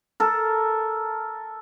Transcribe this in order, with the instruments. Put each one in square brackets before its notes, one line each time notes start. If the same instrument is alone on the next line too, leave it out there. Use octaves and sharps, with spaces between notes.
[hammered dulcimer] A4 A#4